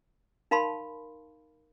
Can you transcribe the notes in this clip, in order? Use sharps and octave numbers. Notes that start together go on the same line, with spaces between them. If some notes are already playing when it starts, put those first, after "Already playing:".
D#4 A#4 F5 A5 B5 C6